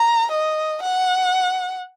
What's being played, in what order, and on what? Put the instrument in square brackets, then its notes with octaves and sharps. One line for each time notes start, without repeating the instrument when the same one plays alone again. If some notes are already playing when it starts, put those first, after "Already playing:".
Already playing: [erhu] A#5
D#5
F#5